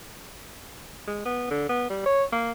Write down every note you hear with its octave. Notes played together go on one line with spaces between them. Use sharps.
G#3
B3
D3
B3
G3
C#5
A#3